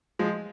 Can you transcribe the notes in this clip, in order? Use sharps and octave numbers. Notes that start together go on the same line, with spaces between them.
F3 G#3